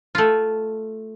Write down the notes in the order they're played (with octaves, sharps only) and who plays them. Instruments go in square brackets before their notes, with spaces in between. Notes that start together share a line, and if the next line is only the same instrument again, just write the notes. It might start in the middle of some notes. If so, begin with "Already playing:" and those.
[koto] A3 F4